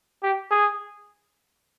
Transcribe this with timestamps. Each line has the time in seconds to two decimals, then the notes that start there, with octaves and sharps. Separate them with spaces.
0.23 G4
0.51 G#4